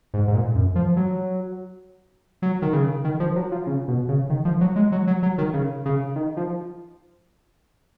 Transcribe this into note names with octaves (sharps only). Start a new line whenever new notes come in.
G#2
G#2
A#2
F#2
F3
F#3
F#3
D#3
C#3
D#3
F3
F#3
F3
C#3
B2
C#3
D#3
F3
F#3
G#3
F#3
F#3
F#3
D#3
C#3
C#3
D#3
F3